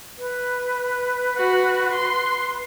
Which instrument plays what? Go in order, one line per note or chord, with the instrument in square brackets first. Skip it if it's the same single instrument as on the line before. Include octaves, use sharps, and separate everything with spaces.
[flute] B4
[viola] F#4
C6